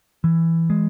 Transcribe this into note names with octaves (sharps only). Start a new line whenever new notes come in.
E3
G#3